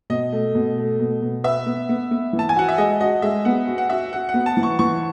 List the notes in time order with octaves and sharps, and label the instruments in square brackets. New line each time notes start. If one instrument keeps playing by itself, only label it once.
[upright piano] B2 [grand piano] D#5
[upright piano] A3
B2
A3
B2
B2
[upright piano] B4 [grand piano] E5
[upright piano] B3
B3
B3
E3
[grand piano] A5
G#5
[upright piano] F#4 [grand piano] F#5
[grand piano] E5
[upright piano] G#3 [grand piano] D#5
[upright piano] F#4 [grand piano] D#5
[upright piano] G#3 [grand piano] E5
[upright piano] B3 [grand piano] F#5
[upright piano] F#4
[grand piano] F#5
[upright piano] F#4 [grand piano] E5
[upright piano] F#4 [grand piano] F#5
[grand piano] F#5
[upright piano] B3
[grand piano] A5
[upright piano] E3
[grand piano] C#6
[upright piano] E3 [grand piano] C#6